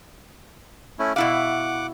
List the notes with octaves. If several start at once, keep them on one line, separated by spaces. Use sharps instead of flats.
A3 C#4 E4
B2 E4 F5 F#5 D6